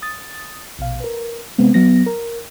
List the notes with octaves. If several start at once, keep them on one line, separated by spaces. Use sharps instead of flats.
D#6 A6
A#1 B2 F5
A#4 B4
C3 G#3 B3 C4
F#3 B3 A#6
A#4